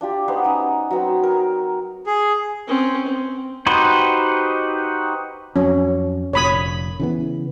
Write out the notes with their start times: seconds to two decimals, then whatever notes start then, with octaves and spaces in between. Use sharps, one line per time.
0.01 D4 F4 G4
0.28 B3 D#4 C5 F#5
0.44 C#4 D#4
0.91 F#3 B3 C4
1.23 A#4
2.06 G#4
2.68 C4 C#4
3.06 C4
3.66 D#4 F#4 G4 B4 C5
5.56 F2 F#3 C#4
6.33 F1 A#2 C#5 B5 D#6
7.00 C#3 E3 B3